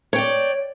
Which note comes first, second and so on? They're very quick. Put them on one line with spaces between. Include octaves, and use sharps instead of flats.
C#5 G5 D5